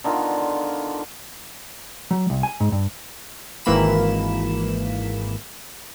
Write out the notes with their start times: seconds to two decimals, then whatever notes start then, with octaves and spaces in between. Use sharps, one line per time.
0.04 D3 D#3 B3 F4
2.11 F#3
2.30 C2
2.43 G#5
2.60 G#2
2.72 G2
3.65 G#1 E3 A#3 B5 E7